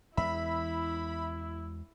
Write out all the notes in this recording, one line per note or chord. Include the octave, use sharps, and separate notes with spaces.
E2 G#3 E4 E5 B5